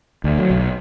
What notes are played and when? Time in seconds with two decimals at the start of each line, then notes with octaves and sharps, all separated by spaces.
0.24 D2
0.39 F#3
0.50 B1